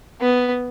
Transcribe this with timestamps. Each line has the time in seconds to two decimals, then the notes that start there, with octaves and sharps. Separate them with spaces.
0.21 B3